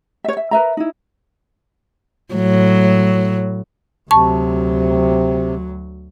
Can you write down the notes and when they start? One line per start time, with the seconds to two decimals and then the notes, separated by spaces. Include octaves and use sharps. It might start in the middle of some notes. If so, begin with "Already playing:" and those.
0.24 C#5 E5
0.37 E5
0.51 A#4 B4 E5 A#5
0.77 D#4 E4
2.34 A2 F#3
4.11 D2 C3 F#3 A5 C#6